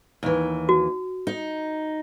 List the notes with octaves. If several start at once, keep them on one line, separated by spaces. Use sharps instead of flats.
D#2 E3
F#4
D#4